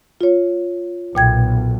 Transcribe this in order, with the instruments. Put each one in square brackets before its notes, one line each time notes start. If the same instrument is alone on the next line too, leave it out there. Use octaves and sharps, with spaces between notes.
[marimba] F4 C#5
[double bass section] B1 [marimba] A#2 G5 G#6